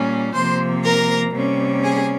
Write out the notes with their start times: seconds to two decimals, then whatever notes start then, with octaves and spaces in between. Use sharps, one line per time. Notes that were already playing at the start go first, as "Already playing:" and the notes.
Already playing: A#2 G3 A#3 C#4
0.34 C3 F3 A#3 C5 C6
0.84 A#4 A#5
1.34 C3 G3 A#3 C#4
1.83 G#4 G#5